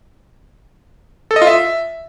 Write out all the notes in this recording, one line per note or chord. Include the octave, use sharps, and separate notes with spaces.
A4
D#5
F4
E5